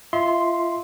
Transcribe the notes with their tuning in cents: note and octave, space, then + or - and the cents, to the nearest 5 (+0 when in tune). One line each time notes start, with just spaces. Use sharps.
F4 -30 E5 -35 C6 +0